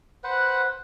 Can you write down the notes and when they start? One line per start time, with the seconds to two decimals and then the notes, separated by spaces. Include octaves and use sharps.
0.24 B4 C5 F#5